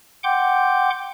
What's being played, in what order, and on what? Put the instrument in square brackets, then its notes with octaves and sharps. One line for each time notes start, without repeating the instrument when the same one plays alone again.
[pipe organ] F#5 G5 C6 D6 G6